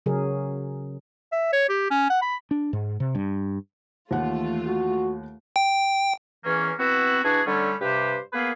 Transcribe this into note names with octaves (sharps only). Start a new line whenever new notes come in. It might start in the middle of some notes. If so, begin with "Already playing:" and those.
C#3 F#3 G#4 A#4
E5
C#5
G4
C#4
F#5
B5
D4
G#2
C3
G2
D#2 E3 A3 F4 F#5
F#4
G5
E2 E3 A#3 C#4
B3 C4 E4 F#4
E3 D4 F#4 G#4
D3 G3 A3 C#4
G2 C3 G4 B4 C5
A#3 B3 G#4 B4 F5